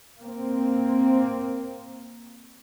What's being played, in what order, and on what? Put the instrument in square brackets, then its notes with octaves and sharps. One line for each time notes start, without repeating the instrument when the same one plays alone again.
[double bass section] A#3 C4